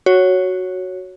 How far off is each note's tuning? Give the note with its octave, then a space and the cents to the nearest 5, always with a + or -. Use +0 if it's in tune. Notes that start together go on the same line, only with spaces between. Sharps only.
F#4 +0 C#5 +0